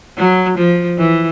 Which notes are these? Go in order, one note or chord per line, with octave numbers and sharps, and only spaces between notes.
F#3
F3
E3